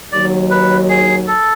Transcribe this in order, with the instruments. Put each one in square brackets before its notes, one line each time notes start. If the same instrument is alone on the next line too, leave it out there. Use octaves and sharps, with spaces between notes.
[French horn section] D#2 D#3 F#3 [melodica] D5
[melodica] B4
G#4
A4